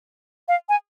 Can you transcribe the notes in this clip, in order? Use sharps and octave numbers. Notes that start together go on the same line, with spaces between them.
F5
G#5